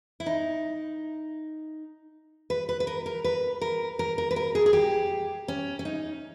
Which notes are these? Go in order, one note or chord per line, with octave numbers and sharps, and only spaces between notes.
E4
D#4
B4
B4
B4
A#4
A#4
B4
A#4
A#4
A#4
B4
A#4
G#4
G#4
G4
C#4
C#4
D#4